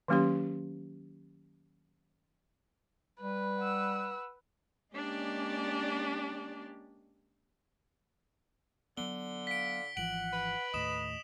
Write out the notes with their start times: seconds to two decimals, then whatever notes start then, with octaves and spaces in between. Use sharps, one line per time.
0.08 D#3 F#3 A#3 C#4 G4 C6
3.21 G3 B4
3.59 F#5 E6
4.93 G#3 A#3 C#4 D4 G4 D5
8.97 D3 F#3 B3 G7
9.47 F5 B6 D7
9.97 G#1 E3 F3 F#5 D7 F#7
10.33 B4
10.74 D#2 A2 D#5 D#6 E7